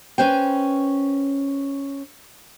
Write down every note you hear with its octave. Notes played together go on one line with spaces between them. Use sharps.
C#4 B4 C5 G5